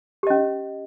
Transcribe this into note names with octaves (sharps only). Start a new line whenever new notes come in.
C#4 G4 D#5